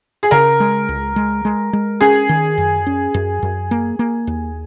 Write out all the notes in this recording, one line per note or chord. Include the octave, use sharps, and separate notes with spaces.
G#4
C#3 A#4
G#3
C#2
G#3
G#3
G#3
C#4 G#4
D#3
F#2
C#4
F#2
F#2
A#3
A#3
D#2